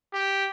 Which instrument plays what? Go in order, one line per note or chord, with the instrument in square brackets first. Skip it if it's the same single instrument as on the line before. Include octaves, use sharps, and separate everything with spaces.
[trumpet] G4